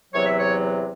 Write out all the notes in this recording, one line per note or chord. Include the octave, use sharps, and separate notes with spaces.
E2 C3 F#3 C#5
E5
C#5